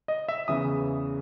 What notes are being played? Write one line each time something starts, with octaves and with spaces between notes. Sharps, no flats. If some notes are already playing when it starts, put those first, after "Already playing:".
D#5
E5
E2 C#3 E3 D#6